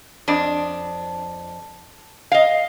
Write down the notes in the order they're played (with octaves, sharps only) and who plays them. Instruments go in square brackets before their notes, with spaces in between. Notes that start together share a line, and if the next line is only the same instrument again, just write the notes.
[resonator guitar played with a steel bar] F2 D4
D#5 F5